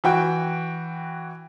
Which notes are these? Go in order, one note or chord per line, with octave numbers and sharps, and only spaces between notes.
E3 F#4 G5